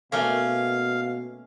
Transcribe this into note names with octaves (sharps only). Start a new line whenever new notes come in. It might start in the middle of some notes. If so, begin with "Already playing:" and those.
B2 A3 A#3 C#4 F5